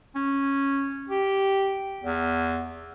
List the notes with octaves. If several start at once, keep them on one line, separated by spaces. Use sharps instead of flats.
C#4
G4
E2